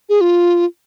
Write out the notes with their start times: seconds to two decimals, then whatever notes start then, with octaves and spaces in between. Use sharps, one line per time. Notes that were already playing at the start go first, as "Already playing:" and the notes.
0.09 G#4
0.21 F4